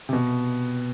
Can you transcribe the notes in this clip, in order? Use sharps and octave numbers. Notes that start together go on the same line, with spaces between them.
C3
B2